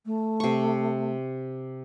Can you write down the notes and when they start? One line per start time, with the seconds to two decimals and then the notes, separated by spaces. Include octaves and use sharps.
0.06 A3
0.40 C3 C#6